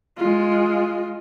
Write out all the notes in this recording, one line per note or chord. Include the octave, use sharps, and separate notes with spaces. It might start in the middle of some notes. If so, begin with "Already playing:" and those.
G#3 F4